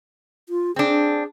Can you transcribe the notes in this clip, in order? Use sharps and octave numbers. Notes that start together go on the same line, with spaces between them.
F4
C4 D4 G#4